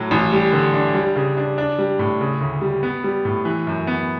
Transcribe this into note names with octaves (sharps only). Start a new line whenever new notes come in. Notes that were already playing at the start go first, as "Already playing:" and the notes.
Already playing: A2 F#3
A1
G3
D3
D4
G3
C#3
D4
D4
G3
A2
C#3
D2
G3
B3
G3
A2
E3
F#2
B3